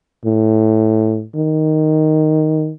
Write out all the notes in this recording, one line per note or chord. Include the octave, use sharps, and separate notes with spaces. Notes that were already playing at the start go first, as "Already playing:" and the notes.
A2
D#3